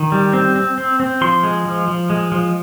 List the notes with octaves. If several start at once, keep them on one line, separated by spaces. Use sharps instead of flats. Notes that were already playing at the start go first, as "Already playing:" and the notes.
Already playing: D#3
G3
C4
C4
C4
C4
F3 C6
G#3
F3
F3
G#3
F3